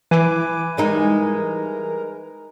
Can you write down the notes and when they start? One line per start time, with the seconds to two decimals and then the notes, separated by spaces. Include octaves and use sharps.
0.11 E3 B4 G#5 D6
0.77 G3 G#3 D#4 A#4